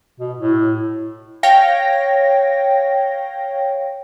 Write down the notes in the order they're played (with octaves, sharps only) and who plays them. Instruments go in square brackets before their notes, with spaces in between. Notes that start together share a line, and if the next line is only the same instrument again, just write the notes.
[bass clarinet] B2
A2
[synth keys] C#5 F5 G5 A#6